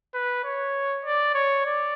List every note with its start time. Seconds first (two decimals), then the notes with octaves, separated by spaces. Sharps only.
0.14 B4
0.44 C#5
1.05 D5
1.34 C#5
1.65 D5